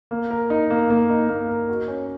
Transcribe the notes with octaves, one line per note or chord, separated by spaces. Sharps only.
A#3
A#4
D#4
A#3
A#3
D#4
A#3
A#4
F#4
C#4